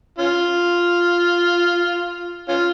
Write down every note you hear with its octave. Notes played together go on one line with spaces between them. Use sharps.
C#4 F4
C#4 F4